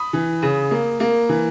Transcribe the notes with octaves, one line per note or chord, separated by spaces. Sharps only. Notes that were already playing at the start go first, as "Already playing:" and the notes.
Already playing: B5 D#6
E3
C#3
A#3
A#3
E3